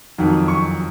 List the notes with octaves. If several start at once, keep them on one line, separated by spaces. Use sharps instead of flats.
F2 D#3 F#3
C#6